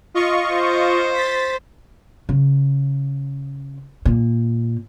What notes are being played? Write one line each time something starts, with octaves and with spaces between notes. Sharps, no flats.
F4 D#5 C#6
C5
A6 B6
C#3
A#2